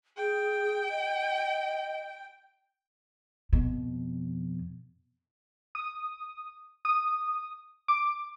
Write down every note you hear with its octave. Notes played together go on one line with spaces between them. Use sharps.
G#4 G5
D#5
F2 B2
D#6
D#6
D6